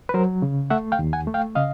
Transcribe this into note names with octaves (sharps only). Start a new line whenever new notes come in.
B4
F#3 A#4 C5
C#3
A3 E5 F#5
F5 G5
D#2
F#5 G#5
A3
F5 G5
C#3 D#5 F5